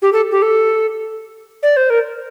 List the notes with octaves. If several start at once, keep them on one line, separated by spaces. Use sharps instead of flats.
G4
A4
G4
A4
D5
C5
A#4